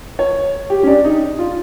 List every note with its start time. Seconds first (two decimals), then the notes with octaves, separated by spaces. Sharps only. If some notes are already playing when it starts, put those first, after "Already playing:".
0.19 C#5
0.70 G4
0.83 C#4
0.87 D4
1.04 D#4
1.39 F4